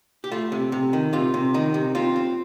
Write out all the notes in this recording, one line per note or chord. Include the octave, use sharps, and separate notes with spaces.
G4
A3 F4
C3
C3
D#3
C3 F4
C3
D#3 D#4
C3
C4 F4
C4